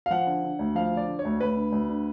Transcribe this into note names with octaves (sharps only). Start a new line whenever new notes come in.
F5
F3 F#5
D3
D3
D2
F3 F5
D3
D5
D3
C#5
D2
D2 B4
D3
D2
D3